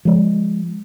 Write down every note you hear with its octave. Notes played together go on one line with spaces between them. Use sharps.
F3 G#3